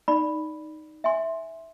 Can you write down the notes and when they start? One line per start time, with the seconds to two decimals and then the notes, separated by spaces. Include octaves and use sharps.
0.08 D#4 D5 B5
1.04 E5 G#5 C6